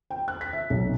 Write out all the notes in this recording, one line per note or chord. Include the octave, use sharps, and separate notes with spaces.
G5
F#6
B6
E5
B1